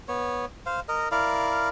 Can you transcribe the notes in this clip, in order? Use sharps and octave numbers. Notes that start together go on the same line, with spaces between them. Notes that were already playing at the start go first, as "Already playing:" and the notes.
B3 C#5
C5 F5
A#4 D#5
E4 A#4 D5 F5